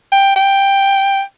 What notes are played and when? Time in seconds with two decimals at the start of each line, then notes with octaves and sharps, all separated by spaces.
0.12 G5
0.36 G5